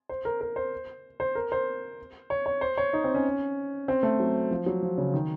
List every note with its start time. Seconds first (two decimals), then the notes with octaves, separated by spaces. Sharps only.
0.09 C5
0.25 A#4
0.41 A#4
0.56 C5
1.20 C5
1.35 A#4
1.52 C5
2.30 C#5
2.46 C#5
2.61 C5
2.77 C#5
2.93 D#4
3.04 C4
3.14 C#4
3.88 C4
4.03 A3
4.20 F#3
4.51 F3
4.66 F#3
4.83 F3
4.98 C#3
5.14 D#3